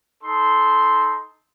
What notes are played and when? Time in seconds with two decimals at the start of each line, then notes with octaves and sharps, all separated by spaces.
0.23 D#4 A4 C6